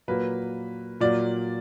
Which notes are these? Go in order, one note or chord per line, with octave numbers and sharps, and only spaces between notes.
A#2 F#3 A#3 B4
A#2 F#3 A#3 D5